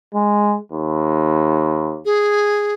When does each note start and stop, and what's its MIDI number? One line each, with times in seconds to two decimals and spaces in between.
0.14 0.56 56
0.72 2.00 39
2.05 2.74 68